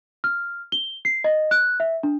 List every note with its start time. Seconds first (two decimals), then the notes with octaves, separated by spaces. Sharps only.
0.24 F6
0.72 G7
1.05 C7
1.24 D#5
1.51 F#6
1.80 E5
2.03 D4